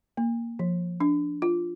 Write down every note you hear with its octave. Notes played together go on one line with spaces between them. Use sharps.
A#3
F3
D4
F4